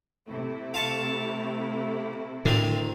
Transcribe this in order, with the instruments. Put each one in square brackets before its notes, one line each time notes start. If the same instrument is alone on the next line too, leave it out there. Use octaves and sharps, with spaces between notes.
[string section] C3 A3 E4
[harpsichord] F4 A5 C#6
[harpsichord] D2 D#3 C4 [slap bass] A2 D3